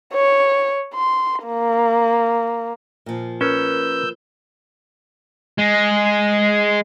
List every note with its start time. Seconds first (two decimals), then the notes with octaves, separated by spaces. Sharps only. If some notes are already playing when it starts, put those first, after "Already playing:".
0.14 C#5
0.95 C6
1.46 A#3
3.06 A#2 F3
3.41 C#4 A#4 B4 E6 G6
5.59 G#3